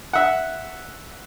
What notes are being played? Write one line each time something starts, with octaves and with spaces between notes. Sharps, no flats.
E5 F#5